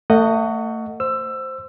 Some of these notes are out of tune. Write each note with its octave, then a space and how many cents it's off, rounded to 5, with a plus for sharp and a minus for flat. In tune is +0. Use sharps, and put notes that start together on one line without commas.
A3 +35 D#5 +0 F#5 +0
C5 +0 E6 +20